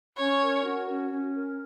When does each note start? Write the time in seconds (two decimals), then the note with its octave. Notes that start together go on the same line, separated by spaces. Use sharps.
0.17 C#4 C#5
0.41 A#4
0.64 F#4
0.88 C#4
1.11 C#4
1.34 A#4